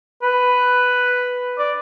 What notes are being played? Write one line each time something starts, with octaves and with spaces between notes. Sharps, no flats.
B4
D5